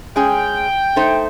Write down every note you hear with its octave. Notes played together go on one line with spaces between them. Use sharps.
G#3 C#4 G#4 G5
A3 D#4 C5